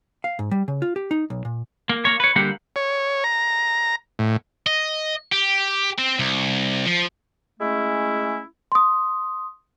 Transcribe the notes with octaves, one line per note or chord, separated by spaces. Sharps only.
F5
G#2
G3
C#3
F4
G4
D#4
B1
A#2
A#3
A#3 C#5
B4 C#5
D3 G3 A#3 G4 F#5
C#5
A#5
A2
D#5
G4
C4
C2
F3
G#3 A3 C#4 E4
C6 D#6